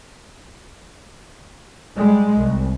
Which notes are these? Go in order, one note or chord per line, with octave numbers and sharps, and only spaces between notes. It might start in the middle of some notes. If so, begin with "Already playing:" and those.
G3 G#3
C2